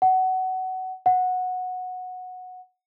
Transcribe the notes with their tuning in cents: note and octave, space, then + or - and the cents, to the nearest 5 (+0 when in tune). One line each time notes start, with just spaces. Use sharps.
F#5 +20
F#5 -10